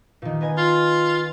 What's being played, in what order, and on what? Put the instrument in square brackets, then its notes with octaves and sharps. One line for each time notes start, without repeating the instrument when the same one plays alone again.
[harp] A#2 D#3
B3 D#5 G#5
[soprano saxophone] F4